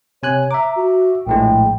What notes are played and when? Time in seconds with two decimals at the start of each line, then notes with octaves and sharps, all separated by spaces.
0.23 C3 C#5 G#5 F#6
0.51 E5 A#5 D6
0.76 F#4
1.27 A#1 A2 G#3 G5